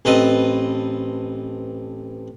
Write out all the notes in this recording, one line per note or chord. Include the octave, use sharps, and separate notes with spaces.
A1 C4 A4 B4 D#5